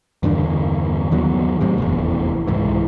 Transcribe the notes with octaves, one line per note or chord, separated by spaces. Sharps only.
E2 G2 D3 D#3
D#2 D#3 F#3 B3
F#2 A2 C3
F1 A#1 E2
C2 G#2 E3